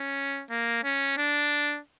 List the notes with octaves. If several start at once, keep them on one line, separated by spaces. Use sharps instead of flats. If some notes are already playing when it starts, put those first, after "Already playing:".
Already playing: C#4
A#3
C#4
D4